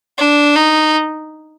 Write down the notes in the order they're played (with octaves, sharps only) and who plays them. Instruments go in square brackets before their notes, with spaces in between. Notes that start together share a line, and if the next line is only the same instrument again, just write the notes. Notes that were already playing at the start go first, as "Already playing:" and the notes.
[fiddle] D4
D#4